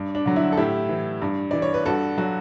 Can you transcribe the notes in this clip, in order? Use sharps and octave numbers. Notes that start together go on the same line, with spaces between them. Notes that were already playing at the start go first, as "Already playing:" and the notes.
Already playing: G2
D4
D3 F#3
E4
A4
A2 E4 G4
E3
G2
E3 D5
C#5
B4
G2 F#4 A4
F#3 F#4 A4